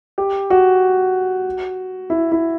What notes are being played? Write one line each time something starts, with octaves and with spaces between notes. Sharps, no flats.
G4
F#4
E4
E4